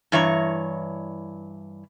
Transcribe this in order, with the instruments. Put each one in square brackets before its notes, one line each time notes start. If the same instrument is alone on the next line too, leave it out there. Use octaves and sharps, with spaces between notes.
[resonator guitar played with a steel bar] G2 E3 C#5 A#5